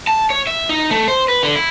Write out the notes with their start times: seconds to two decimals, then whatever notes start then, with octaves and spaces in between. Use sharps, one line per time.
0.07 A5
0.30 C#5
0.47 E5
0.69 D#4
0.91 A3
1.08 C5
1.28 B4
1.43 D3
1.55 E4